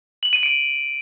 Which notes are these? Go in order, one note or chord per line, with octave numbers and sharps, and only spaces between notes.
F#7
D#7
D7